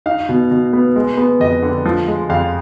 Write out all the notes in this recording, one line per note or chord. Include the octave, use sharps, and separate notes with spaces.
D#4 F5
B2
B2
B3
G#3
B3
F2 D#5
D3
F3
G#3
F2 F5